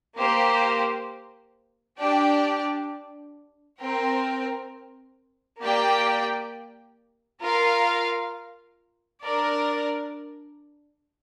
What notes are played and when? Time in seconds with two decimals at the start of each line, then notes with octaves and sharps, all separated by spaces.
0.18 A#3 G4 C5
1.98 D4 G4 D5 G5
3.80 C4 A#4 G5
5.61 A#3 G4 D5 G5
7.42 F4 A#4 F5
9.22 D4 A#4 D5